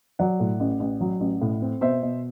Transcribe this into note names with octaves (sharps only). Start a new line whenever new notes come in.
F#3 D5 F#5
A2
A1
A1
F#3
A1
A2
C4
B2 C5 E5
B2